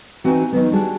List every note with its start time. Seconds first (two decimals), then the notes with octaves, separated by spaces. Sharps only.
0.24 E3 C4 D#4 F#4 G#5
0.52 D#3 F#3 B3
0.72 G3 D4 F#4 G#4